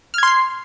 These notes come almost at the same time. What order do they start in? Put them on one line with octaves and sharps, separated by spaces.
F6 G#6 C6 C7